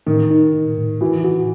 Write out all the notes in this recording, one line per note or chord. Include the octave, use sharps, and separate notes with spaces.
A2 D#3
D#4
D#4
A2
E3 F#4
F#4